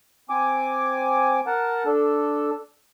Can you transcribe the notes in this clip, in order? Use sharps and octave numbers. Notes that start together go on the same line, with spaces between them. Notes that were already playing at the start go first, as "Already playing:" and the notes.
C4 G#5 D6
A#4 F#5 A5
D4 A4